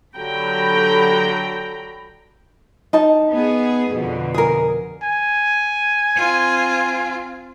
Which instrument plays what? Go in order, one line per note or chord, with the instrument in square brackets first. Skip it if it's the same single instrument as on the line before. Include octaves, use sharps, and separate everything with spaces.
[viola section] D3 F#3 G4 G5 A#5 B5
[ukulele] D#4 A5
[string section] B3 G#4
F2 B2 D3
[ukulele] G#4 A#4
[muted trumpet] G#5
[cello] C4 F4